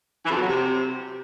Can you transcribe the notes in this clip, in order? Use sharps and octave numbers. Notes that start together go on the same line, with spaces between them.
E3
F2
B2
F#3
C3